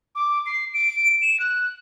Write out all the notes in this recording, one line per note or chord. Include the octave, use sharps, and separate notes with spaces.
D6
C7
D7
E7
F#6